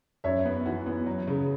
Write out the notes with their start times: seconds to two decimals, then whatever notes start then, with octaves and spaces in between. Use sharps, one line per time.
0.24 F#2 C#5 E5
0.45 B3
0.66 E3 F#4
0.86 B3
1.06 F#3
1.27 C#3